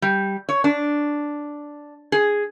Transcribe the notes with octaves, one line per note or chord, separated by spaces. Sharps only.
G3
C#5
D4
G#4